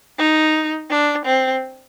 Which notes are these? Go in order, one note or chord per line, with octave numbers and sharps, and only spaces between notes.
D#4
D4
C4